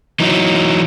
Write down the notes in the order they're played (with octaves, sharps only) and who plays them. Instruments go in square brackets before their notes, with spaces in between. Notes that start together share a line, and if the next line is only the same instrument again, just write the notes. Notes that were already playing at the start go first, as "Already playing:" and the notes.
[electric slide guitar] E3 F#3 D#4